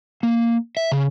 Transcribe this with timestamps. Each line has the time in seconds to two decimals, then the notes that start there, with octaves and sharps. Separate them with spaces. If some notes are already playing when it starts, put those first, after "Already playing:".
0.23 A#3
0.77 E5
0.92 C#3